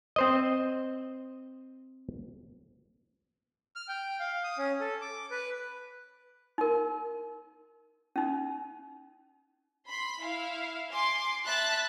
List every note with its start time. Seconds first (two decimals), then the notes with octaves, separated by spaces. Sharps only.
0.16 C4 C5 D#5
3.76 F6
3.88 G5
4.20 F5
4.44 D#6
4.58 C#4
4.80 A4
5.01 D6
5.31 B4
6.58 D#4 A#4
8.16 C#4 D#4
9.88 B5 C6
10.23 E4 F5
10.90 G#5 C6 D6
11.46 E5 A5 B5 F#6 A6